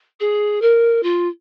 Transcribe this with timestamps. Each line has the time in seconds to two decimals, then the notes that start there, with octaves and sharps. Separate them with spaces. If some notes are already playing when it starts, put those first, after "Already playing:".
0.20 G#4
0.61 A#4
1.02 F4